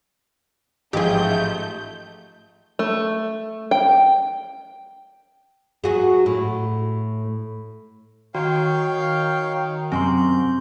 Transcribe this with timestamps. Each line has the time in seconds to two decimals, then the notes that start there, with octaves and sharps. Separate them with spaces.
0.93 A1 G#2 F3 A3 G4 G#4 G6
2.79 A3
3.71 G5
5.84 F#3 F#4 G#4
6.26 A2
8.35 D#3 F#4 C#5 F5 G5
9.92 F#2 C3 C4 C6 G6